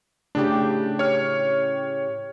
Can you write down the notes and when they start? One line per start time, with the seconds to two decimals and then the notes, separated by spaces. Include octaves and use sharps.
0.35 A2 C#3 D4 G4
0.99 C#5 F6